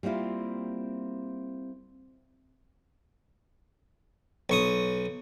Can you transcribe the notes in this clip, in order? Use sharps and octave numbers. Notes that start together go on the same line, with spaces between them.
G3 A#3 C4 E4 F4
B1 C#6 D#6